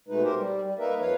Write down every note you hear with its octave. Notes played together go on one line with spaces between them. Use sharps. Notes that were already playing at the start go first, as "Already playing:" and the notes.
B2 G#3 A3 D#4 B4
G4 A#4 C5
G3
G3
A#3 D#4 A#4 B4 E5
F2 F3 B4 C#5 F5